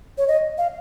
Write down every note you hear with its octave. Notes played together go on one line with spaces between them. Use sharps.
C#5
D#5
F5